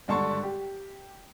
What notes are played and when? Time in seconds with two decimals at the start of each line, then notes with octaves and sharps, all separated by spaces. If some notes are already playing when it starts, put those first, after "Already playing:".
0.08 G#1 G2 D3 A5 C6 C#6
0.43 G4